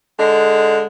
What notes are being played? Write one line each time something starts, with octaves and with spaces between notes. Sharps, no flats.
D3 G#3